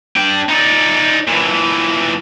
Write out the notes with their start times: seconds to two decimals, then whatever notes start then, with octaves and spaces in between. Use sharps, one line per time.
0.16 D4 G5
0.49 D#4 D5
1.27 A#2 E3